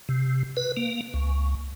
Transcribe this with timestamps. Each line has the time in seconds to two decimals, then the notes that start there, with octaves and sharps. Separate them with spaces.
0.09 C3
0.57 B4
0.77 A#3
1.14 C#2